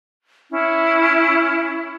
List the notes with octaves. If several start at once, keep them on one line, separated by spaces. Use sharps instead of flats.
C#4 E4